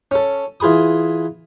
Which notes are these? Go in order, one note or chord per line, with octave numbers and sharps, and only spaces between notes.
C#4 A4
E3 F4 G#4 B5 D#6